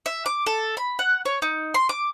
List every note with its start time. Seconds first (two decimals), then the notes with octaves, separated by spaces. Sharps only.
0.06 E5
0.26 D6
0.46 A4
0.77 B5
0.99 F#5
1.25 C#5
1.42 D#4
1.74 C6
1.89 D6